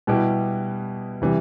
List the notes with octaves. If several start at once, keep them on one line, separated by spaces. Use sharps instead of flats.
B2 G3 B3 E4 G4
C3 E3 G3